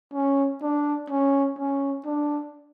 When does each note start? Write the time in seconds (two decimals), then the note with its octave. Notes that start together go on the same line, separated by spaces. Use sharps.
0.14 C#4
0.62 D4
1.10 C#4
1.58 C#4
2.06 D4